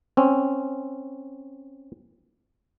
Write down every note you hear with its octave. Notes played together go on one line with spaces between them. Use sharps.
C4 C#4